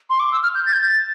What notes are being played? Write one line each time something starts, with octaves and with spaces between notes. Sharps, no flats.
C6
D6
E6
F6
G6
A6
G6
A6